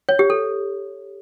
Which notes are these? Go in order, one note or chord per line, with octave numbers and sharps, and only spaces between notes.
C#5
G4
A4